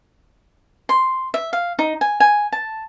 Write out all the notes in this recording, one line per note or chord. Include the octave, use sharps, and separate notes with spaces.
C6
E5
F5
D#4
G#5
G#5
A5